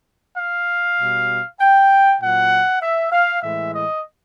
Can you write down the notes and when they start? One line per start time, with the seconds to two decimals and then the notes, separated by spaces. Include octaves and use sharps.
0.36 F5
0.99 B2 G3
1.60 G5
2.20 A#2 F#3 F#5
2.82 E5
3.11 F5
3.42 A2 E3 G#3 E5
3.73 D#5